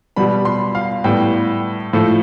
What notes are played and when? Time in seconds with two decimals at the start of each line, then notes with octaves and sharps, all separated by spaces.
0.16 B2 G3 B3 B5
0.45 C6
0.75 F5
1.04 A2 G3 B3 G5
1.93 A2 F3 A3